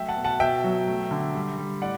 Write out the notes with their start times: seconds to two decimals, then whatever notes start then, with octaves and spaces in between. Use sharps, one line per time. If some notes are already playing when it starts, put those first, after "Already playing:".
Already playing: F#3 A3 E5 G5
0.08 F#5 A5
0.17 B2
0.24 F#5 A5
0.40 B2 E5 G5
0.64 F#3
0.87 A3
1.11 D3
1.35 G3
1.58 G3
1.82 A2 D5 F#5